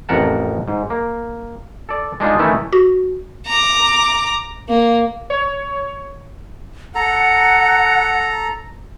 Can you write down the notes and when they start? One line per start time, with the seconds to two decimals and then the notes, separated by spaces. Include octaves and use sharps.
0.09 A1 F2 A#4 F#5 A5
0.68 G#2
0.90 A#3
1.89 A4 D5
2.20 G#3 D4 D#4 F4
2.39 D#3 E3 A3 C#4 E4
2.72 F#4
3.47 A#5 D6
4.69 A#3
5.30 C#5
6.95 A4 F#5 A#5